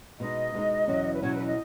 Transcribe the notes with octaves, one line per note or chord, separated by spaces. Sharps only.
B2 G#3 D#4 D#5
B2 G#3 D#4
E2 B2 F#3 C#4
B4
E2 B2 F#3 C#4 C#5
B4
D#5